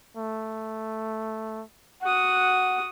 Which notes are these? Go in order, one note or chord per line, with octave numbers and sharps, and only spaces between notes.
A3
F#4 F#5 D#6